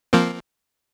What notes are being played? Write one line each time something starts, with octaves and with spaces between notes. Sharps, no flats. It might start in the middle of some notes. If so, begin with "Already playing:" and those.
F3 A#3 C4